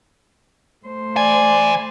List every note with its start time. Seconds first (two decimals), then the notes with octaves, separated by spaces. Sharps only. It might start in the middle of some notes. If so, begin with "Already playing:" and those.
0.86 A3 C5
1.17 E3 D5 G#5